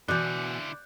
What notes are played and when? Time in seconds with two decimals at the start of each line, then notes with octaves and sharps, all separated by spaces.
0.08 B2 D3 E3 E4 D5 F#6 G6